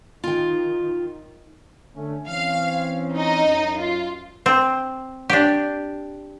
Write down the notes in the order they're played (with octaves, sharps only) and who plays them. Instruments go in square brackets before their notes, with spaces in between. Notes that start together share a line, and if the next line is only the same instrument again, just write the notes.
[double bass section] D#3 [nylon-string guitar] F4 G5
[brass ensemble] D3 A3 C#4
[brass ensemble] E3 C4 C#4 [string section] F5
[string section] D#4 D#5
[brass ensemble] F#2
[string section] F4
[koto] C4
D4 G4